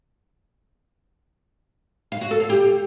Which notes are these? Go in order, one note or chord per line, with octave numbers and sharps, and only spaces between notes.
F5
F#4
A4
F5
G4